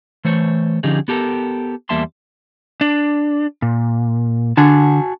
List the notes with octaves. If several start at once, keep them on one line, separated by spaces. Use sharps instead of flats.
E3 A3 C5 C#5
D3 F3 C#4 D#4 G4 G#4
B3 G4 A4 A#4
E2 G3 A#3 E5 A5 C6
D4
A#2
D3 F#4 G#5 A5